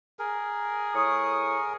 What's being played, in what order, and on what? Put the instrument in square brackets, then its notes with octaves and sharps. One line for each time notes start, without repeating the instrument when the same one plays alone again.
[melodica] G#4 A#4
[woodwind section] A2 C#6 D#6